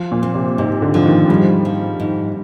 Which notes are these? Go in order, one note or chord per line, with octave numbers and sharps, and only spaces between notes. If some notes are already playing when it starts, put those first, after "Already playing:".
Already playing: F3
A#2
C4
C3
G#2 C3
D3
D3 F3
D#3
G#2 G3
F3
G#2